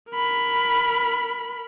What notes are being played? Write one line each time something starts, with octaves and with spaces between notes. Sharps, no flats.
A#4 B5